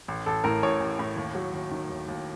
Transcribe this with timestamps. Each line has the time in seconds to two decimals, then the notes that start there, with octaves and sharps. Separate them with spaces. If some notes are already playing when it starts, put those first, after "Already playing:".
0.08 A1
0.26 A1 A4
0.44 A2 A#4
0.63 A1 C#5
0.80 A1
0.99 A2
1.17 D#2
1.35 F#3
1.53 D#2
1.71 D#3
1.89 D#2
2.08 D#2